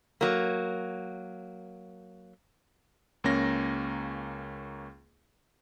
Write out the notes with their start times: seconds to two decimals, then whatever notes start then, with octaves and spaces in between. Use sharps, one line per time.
0.21 F#3 A#3
3.24 C#2 A#3 C#4 A#6